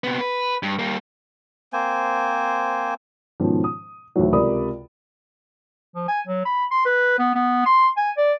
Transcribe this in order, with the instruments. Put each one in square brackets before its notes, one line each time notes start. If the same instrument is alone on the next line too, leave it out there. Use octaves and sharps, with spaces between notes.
[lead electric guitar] C3 B3
B4
G2
G3 A#3
[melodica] A#3 C4 C5 G#5
[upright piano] G#2 B2 D#3 F3 C#4
D#6
D2 A2 D#3 E3 F#3
C#2 C3 A#4 D5 B5 D#6
[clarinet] F3
G#5
F#3
B5
C6
B4
B3
B3
C6
G#5
D5